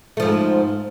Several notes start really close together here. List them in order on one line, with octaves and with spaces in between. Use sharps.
A3 F3 G#2